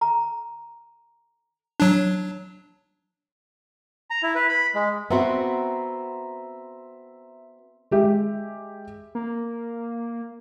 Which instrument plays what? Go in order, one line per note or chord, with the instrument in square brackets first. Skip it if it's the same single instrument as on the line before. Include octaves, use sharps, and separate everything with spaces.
[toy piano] A#5
[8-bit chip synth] F#3 D4
[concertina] A#5
E4
B4
B5
G#3
[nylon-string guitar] B3 C4 F#4 [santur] E5 A#5 C6
[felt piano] G#3 G4 E5
[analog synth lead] A#3